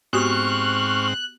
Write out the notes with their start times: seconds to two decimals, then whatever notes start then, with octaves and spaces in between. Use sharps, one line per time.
0.13 G#2 B3 C4 F#4 G4 C#6 F6 F#6